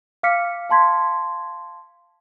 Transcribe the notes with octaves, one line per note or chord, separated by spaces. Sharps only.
F5 D6 F6 B6 C#7
F5 A5 C6 G#6 B6